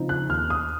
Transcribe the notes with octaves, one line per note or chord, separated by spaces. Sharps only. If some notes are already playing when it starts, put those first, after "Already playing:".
Already playing: C#3 F3 C4 D#4
F#6
D#2 F6
D#6